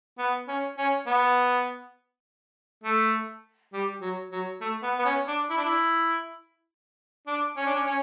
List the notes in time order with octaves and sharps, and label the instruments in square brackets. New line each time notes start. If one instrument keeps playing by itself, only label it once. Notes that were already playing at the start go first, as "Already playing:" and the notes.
[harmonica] B3
C#4
C#4
B3
A3
G3
F#3
F#3
A3
B3
B3
C#4
D4
E4
D4
E4
D4
C#4
D4
C#4
C#4